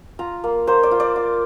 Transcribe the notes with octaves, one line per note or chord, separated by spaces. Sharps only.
F4 A#5
A#3
A#3 C5
D5
F4
D5
F4